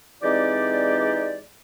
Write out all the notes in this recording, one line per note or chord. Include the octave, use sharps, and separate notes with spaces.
E3 G#3 C4 D#4 G4 D5